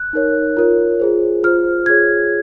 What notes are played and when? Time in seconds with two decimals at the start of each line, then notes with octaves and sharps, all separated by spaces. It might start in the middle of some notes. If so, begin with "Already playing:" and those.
Already playing: F#6
0.13 D#4 A#4 C#5
0.57 F4 A#4 C#5
1.00 F4 G#4 C5
1.44 F4 C5 F6
1.86 F4 G#4 C#5 G#6